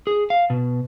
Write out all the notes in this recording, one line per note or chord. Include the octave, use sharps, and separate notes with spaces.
G#4
F5
B2